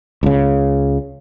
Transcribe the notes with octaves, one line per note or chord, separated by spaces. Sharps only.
C#2 C#3